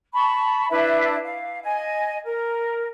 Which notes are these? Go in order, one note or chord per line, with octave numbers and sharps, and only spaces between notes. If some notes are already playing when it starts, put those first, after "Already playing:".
A5 B5 C#6
D4 E4 B4 E5
F5
D#5 G#5
A#4